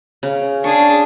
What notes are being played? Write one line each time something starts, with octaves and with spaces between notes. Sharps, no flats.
C#3
D4 G#4 C#6